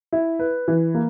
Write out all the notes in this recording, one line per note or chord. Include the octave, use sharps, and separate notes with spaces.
E4
B4
E3
A#3